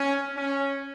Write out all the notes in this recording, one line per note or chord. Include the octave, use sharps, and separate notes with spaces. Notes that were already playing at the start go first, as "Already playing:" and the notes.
Already playing: C#4
C#4